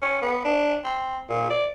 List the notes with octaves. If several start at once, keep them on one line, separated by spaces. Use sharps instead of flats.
C#4
B3
D4
C4
A#2
D5